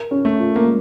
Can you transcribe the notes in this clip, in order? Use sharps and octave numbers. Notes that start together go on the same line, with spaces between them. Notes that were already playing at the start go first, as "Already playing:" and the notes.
Already playing: A#4
C#4
A3
F4
A#3
G#3